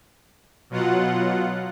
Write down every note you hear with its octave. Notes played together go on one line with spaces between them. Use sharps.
B2 F#3 F4 F#5